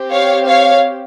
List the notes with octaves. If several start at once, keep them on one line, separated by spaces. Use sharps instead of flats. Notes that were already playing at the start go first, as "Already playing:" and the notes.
Already playing: C4 G4
C#5 F5
C#5 F5